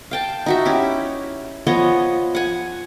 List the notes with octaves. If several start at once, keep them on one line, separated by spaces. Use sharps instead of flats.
F5 G5 A5
D#4 F#4 E5
C#4 E4 G4
F3 B3 C#5 D#5
F#5 G#5